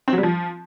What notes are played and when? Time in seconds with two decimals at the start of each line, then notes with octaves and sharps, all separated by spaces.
0.08 C4
0.13 F#3
0.18 G3
0.23 F3